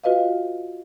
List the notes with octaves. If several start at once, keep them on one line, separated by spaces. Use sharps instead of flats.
F4 F#4 B4 D#5 F5